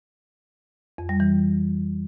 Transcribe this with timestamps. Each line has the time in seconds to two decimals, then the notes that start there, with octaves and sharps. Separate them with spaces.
0.98 F2
1.09 G3
1.20 E3